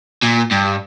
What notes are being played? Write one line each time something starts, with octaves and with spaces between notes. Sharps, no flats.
A#2
G2